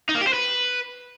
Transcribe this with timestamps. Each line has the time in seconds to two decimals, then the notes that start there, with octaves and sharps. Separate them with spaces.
0.09 D#4
0.15 A#3
0.21 G4
0.27 C5
0.34 B4